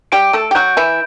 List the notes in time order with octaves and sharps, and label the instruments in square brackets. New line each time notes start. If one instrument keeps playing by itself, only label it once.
[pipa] G3 G4 [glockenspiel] D7
[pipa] A3 A4
G4
[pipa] F#3 F#4 [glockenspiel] G6
[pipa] E3 E4